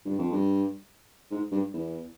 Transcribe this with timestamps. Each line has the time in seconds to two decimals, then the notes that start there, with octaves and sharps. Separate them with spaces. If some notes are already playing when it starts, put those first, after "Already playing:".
0.05 G2
0.19 F2
0.32 G2
1.31 G#2
1.52 G2
1.73 E2